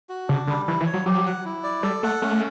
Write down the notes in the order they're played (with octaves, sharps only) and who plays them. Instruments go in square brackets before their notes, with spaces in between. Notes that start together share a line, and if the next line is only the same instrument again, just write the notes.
[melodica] F#4
[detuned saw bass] C#3 [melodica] D4
[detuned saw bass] D3 [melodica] G3
[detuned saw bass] E3 [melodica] E4
[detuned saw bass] E3
[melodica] C#5
[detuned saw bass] F#3
[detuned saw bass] F#3 [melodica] G4
[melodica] F#5
E4
D5
[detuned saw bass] G3 [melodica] A4
[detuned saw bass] A3 [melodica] F#5
[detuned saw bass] A3 [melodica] C#4